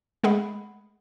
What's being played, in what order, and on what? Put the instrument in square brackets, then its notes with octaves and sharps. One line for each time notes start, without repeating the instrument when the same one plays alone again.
[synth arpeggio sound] G#3 A3 G#4 F#5 B5